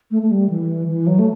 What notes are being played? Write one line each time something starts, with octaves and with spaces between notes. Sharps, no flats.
A3
A3
G3
E3
E3
F#3
A3